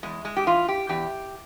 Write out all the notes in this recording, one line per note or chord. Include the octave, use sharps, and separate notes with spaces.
E2 G#3
G#3
G4
E3 F4
G4
E2 G4